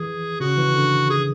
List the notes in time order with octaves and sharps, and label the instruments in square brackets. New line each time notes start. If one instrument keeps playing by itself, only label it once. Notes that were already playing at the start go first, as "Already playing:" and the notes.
Already playing: [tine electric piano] E3 [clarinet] G#4
[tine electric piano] C#3 [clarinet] F#4
[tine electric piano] E3
D3
[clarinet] G#4